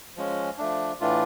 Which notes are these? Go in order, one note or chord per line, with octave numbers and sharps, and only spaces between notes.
F3 G#3 C#4
F3 A3 D4
A2 E3 A3 D4 F4